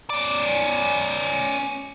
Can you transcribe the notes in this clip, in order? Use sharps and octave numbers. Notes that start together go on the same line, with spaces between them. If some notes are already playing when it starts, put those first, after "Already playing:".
C#4 D5